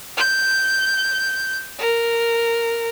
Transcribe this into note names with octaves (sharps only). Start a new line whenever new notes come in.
G6
A#4